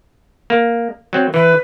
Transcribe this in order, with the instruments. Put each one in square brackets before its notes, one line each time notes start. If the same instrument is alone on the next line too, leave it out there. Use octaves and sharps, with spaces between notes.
[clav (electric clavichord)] A#3
F#3 C4
[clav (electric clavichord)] E3 [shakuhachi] B4